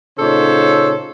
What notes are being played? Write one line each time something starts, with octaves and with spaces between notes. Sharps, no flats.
A#2 C#3 D#4 A4 C5 C#5